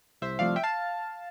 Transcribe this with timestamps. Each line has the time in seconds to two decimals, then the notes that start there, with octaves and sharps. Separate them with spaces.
0.22 C2 C5 E5
0.39 C3 F3 A3 D5 F5
0.56 E5 G5
0.64 F5 A5